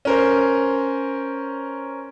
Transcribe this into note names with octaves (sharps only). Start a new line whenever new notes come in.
C#4 A#4 C5